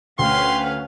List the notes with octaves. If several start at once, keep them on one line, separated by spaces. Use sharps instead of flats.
D2 C#4 B4 F5 G5 C6